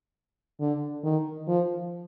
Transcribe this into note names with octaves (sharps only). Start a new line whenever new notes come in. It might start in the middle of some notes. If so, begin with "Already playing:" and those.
D3
D#3
F3